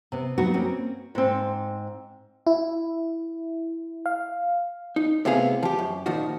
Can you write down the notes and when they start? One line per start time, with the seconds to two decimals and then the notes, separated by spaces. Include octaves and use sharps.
0.12 C3 B3
0.38 F#3 B3 D#4 F#4
0.54 A#3 C4 C#4
1.15 G#2 C4
2.47 E4
4.06 F5
4.96 D#4
5.25 A2 C3 B3 C4 G#4 F5
5.63 F3 G4
5.79 F#2
6.06 A#2 D#3 F3 F#4